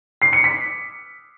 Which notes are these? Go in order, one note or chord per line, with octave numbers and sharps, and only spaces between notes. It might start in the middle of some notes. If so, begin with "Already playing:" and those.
C7
C#7
B6